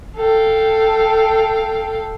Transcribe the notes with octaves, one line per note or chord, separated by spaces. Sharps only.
A4 F5 G5